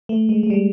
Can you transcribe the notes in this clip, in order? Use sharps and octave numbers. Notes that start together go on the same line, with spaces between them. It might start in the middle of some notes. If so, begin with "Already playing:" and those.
A3
G#3
G#3
G3